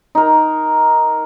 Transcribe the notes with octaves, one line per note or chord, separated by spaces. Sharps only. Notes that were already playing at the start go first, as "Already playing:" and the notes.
D#4 A#4